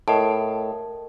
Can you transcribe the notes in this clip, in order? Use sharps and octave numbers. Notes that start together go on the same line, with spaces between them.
A2 A#4 D#5 A5